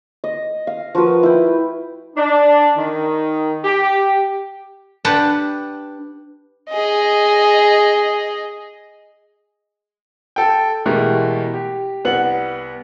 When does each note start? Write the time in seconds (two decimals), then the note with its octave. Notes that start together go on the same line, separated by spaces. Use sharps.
0.24 D#5
0.67 F5
0.95 F3 F#4 A#4 B4
1.23 E4 G5
2.17 D4
2.77 D#3
3.65 G4
5.05 D4 G4 B4 F#5 A5
6.70 G#4 D#5
10.36 A4 G5
10.86 B2 E3 G#3 A3 G4 A#4
11.54 G4
12.05 C2 B3 F#5 F#7